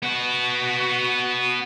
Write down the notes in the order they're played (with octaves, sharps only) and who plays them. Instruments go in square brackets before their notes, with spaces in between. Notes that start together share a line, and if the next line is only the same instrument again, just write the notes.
[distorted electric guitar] B3 F#4